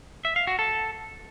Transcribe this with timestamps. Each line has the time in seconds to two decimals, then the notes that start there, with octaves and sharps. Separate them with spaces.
0.25 E5
0.36 F5
0.47 F#4
0.59 A4